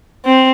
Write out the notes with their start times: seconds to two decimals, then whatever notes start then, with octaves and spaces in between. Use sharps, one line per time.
0.25 C4